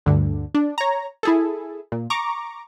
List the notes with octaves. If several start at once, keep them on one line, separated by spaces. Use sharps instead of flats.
D2 G2 D3
D4
C#5 A#5
E4 G#4 A4
A#2
A#5 C#6 D6